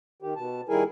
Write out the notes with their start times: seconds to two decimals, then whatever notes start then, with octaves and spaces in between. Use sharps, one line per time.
0.22 D#3 G4
0.36 B2 A5
0.69 D#3 G3 E4 G#4 A#4 G#5